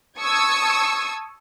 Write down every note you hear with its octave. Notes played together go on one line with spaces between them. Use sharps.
A5 C#6 D#6 E6 G#6